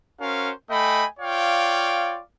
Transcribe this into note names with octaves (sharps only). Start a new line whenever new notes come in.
C#4 F#4 A#4 C5 F5
A3 D#5 G5 G#5 B5
F4 C#5 D5 F5 G5